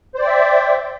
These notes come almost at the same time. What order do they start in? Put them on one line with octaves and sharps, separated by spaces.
C5 D5 G5 E5